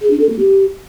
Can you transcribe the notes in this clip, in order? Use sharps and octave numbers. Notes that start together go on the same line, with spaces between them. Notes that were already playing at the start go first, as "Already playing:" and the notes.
G#4
D4
A4
A#3
G4